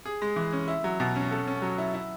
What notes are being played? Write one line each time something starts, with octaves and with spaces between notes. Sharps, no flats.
G#4
G#3
E3
C#4
E4
F#3
B2
C#4
A4
C#4
F#3
E4
E4